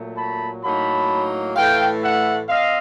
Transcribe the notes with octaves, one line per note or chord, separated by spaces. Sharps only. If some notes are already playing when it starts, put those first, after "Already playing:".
Already playing: A#2 F#3 A3
A5 B5
A2 F#3 A#3 D#4 A5 B5
A2 E3 A3 F5 G5
E5 F#5
C4 D#5 F5